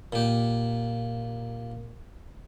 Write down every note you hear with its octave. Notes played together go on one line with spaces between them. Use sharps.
A#2 G4